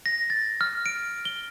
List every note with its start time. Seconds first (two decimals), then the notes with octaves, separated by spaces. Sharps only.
0.06 A#6
0.30 A6
0.61 F6
0.86 D7
1.25 G7